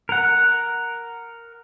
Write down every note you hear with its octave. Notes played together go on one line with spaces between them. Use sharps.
A#4 F#5